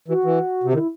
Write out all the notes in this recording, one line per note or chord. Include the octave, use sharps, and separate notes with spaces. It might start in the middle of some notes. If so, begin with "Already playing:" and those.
E3 F#4
E3
C3
D#3 E4